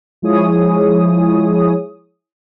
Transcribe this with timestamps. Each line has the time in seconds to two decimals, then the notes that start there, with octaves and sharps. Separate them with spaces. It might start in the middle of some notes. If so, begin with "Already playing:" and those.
0.22 F3 G#3 E4 G#4 C#5 D#6